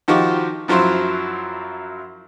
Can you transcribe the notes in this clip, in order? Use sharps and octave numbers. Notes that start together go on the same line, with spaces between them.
D#3 F3 D#4 F#4 G4
F#2 F3 F#3 E4 C5